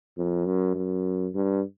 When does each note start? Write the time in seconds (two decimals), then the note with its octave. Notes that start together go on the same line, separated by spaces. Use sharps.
0.17 F2
0.46 F#2
0.75 F#2
1.35 G2